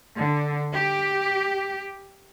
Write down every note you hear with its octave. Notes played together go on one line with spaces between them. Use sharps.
D3
G4